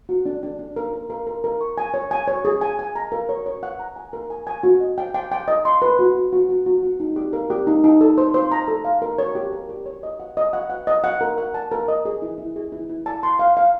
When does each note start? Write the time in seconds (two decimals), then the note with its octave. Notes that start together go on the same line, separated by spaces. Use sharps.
0.09 F#4
0.26 D4
0.43 D4
0.59 D4
0.76 A#4
0.93 A#4
1.10 A#4
1.27 A#4
1.44 A#4
1.61 C#6
1.78 G#5
1.94 C#5
2.11 G#5
2.28 C#5
2.45 G#4
2.61 G#5
2.79 G#5
2.96 A#5
3.12 A#4
3.29 C#5
3.46 C#5
3.63 F#5
3.80 A#5
3.96 G#5
4.13 A#4
4.30 G#5
4.47 G#5
4.63 F#4
4.80 D#5
4.98 G5
5.14 G5
5.32 G5
5.48 D#5
5.65 C6
5.82 B4
5.99 F#4
6.15 F#4
6.33 F#4
6.49 F#4
6.66 F#4
6.83 F#4
7.00 D#4
7.16 G4
7.33 A#4
7.50 G4
7.67 D#4
7.84 D#4
8.01 A4
8.18 C5
8.34 C5
8.51 A#5
8.68 A4
8.85 F5
9.02 A#4
9.19 C#5
9.35 G4
9.52 A#4
9.69 G4
9.86 C#5
10.03 D#5
10.20 F#5
10.37 D#5
10.53 F#5
10.70 F#5
10.87 D#5
11.04 F#5
11.21 A#4
11.38 F#5
11.54 A5
11.72 A#4
11.88 D#5
12.05 G#4
12.22 E4
12.38 E4
12.56 G#4
12.72 E4
12.89 E4
13.06 A5
13.23 C6
13.39 F5
13.57 F5